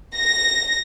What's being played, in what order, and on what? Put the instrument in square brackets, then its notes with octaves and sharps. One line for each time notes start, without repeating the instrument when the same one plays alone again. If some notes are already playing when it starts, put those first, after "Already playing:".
[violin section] A#6